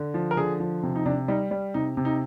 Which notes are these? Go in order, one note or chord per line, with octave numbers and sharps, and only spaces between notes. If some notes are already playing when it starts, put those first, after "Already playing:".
Already playing: D3
F3
A#4
D3 G#4
F3
C3
D#4
C3 D4
G3 D#4
G3
C3 D#4
C3
D#4